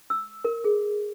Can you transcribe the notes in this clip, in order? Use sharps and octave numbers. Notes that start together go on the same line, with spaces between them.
E6
A#4
G#4